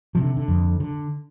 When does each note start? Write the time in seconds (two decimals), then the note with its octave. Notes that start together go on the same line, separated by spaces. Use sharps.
0.15 C3 F3
0.23 D3
0.37 D3
0.48 F2
0.80 D3